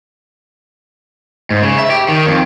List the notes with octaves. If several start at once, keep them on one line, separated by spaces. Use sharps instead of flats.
G#2
C#3
E5
G4
D#3
F2